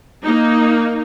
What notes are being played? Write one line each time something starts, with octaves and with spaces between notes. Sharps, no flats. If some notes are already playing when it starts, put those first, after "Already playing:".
A#3 D#4